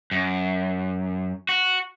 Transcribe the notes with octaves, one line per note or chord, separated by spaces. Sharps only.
F#2
F#4